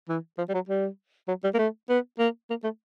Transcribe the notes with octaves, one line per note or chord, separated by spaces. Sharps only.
E3
F3
G3
F#3
G3
F#3
G3
A#3
A3
B3
A#3
A#3
A3